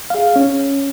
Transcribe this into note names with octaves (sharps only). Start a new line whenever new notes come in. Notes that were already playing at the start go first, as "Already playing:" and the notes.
G#4 F5
C#4